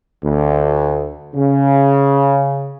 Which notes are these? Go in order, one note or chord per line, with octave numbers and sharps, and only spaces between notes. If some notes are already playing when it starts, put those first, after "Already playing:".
D2
C#3